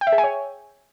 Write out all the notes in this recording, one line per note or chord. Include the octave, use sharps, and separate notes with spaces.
G5
E5
G#4
G#5
C#5